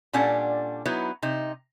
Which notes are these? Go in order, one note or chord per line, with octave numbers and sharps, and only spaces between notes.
A#2 G3 C#4 D4 A4 F#5
F#3 B3 D#4 E4
C3 D#4